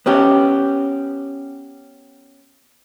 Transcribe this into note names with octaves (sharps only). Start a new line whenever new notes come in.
B3 C#4 G4